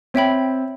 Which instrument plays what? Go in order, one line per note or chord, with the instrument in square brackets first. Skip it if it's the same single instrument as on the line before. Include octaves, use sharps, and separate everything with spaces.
[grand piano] C4 [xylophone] C#5 E5 G5 B5